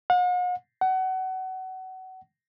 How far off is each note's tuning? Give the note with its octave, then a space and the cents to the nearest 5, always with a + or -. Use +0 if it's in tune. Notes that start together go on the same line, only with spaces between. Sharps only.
F#5 -45
F#5 +25